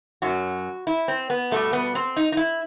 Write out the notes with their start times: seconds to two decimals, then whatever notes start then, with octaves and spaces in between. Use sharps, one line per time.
0.22 F#2 F#3 F#4
0.87 E4
1.08 C4
1.30 B3
1.51 B2 G3 A3
1.73 B3
1.95 C4
2.16 D#4
2.32 D#4
2.37 E4